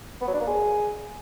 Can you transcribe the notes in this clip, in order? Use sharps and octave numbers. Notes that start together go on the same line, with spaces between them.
B3
F#3
D4
A#3
G#4